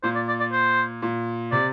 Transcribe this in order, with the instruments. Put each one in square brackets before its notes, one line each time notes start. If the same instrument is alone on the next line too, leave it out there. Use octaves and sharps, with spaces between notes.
[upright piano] A#2 [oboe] C5
[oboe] D5
D5
D5
C5
[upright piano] A#2
[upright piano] C3 [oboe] D5